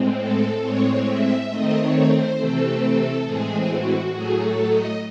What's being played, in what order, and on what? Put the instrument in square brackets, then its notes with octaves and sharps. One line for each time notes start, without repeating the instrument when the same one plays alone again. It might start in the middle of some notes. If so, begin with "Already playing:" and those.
Already playing: [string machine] A2 G#3 C4
A4
A2 G#3 C4 C#5
E5
D#3 A3 C4 D#5
C#5
C5
C3 E3 A3 C4 A4
A2 E3 G#3 C4 G#4
F#4
A2 F#3 A3 G#4
A4
D#5